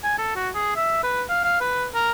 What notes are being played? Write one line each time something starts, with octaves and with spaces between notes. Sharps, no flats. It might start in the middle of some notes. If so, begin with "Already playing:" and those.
G#5
A4
F#4
G#4
E5
B4
F5
F5
B4
A#4